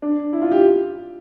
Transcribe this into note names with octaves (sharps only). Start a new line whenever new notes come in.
D4
E4
F4
G4